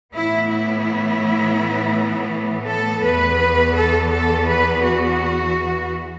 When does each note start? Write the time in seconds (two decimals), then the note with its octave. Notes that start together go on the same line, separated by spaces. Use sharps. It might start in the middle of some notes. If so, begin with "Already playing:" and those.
0.15 A2 E3 B3 E4
0.51 E4
2.68 A4
3.05 E2 E3 B3 B4
3.77 A4
4.13 A4
4.49 B4
4.85 F#4